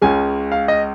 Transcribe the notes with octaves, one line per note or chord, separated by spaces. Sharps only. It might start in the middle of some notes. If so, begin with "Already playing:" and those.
C#2 C#3 G#3 G#5
F5
D#5